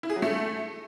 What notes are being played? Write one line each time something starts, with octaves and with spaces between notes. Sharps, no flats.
E4
G#4
F#3
A3